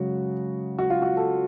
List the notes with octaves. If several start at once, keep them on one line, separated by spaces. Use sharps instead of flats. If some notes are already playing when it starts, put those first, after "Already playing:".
Already playing: F#2 C#3 G#3 F#4
F#4
F4
F#4
A4